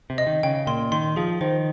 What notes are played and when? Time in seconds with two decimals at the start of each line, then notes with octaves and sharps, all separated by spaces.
0.10 C3
0.18 D#5
0.27 D#3
0.43 C#3 G5
0.67 A#2 C6
0.92 D#3 C6
1.16 F3 G#4
1.41 D#3 C5